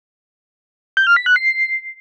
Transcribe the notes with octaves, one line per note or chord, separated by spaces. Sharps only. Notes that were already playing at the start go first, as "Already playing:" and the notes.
G6
F6
B6
F#6
C7